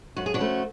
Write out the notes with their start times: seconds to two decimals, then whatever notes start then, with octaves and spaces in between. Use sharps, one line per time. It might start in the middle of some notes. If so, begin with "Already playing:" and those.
0.16 F#2 F#4
0.26 G#4
0.34 D4 F#4
0.39 C#3 F3 A3 C#4